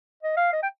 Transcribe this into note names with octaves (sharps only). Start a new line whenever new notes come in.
D#5
F5
D#5
G5